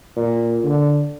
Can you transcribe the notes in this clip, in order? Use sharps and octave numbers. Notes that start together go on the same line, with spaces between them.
A#2
D3